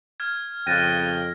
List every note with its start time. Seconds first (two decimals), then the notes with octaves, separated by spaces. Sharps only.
0.20 F6 G#6
0.67 F2 C#3 G5 F#6 A6 A#6 D#7